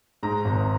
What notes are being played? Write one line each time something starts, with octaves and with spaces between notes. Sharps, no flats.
G#2 A#5
G#1